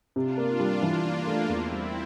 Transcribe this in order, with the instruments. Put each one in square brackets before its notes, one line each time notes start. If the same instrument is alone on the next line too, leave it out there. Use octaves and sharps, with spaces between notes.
[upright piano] C3 [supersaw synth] D4 F4
[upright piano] A#3
G3
[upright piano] E3 [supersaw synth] A#3 D4
[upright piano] D4
A3
[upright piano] E2 [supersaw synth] C4 E4
[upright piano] G3